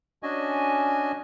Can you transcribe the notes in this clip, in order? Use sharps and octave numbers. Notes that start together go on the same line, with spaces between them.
C#4 D4 F#4 D#5 G#5